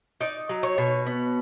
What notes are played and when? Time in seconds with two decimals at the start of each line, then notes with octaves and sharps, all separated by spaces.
0.21 D#4 D5
0.49 F#3
0.63 C#5
0.78 B2
1.06 B3